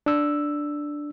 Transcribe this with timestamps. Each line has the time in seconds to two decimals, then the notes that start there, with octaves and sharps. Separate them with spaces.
0.06 D4 E6